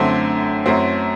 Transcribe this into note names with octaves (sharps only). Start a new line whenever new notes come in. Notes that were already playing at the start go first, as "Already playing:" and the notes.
Already playing: F#2 D3 A3 C4
F#2 F#3 A3 C4